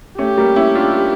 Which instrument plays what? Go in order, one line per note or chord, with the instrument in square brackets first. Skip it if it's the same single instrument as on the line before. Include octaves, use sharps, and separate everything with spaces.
[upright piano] A3 C#4 [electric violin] G4
[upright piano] G3 A#3
C#4 E4
D4 F4